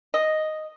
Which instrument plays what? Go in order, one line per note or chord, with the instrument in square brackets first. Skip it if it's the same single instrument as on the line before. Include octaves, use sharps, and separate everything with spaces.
[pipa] D#5